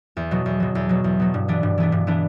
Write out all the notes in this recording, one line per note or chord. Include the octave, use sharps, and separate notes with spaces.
E2
B2 F#3
E2
B2 F#3
E2
B2 F#3
E2
B2 F#3
G2
E3 B3 D4
G2
E3 B3 D4
G2
E3 B3 D4